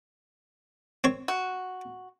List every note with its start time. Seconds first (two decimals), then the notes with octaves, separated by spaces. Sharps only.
1.04 C4 C#5
1.28 F#4